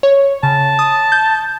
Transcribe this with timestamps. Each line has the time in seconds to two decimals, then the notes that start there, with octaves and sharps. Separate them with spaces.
0.03 C#5
0.43 C#3 A5
0.79 D#6
1.12 G6